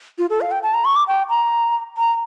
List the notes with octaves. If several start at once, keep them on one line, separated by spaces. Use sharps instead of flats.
F4
A4
F5
G5
A5
A#5
C#6
D6
G5
A#5
A#5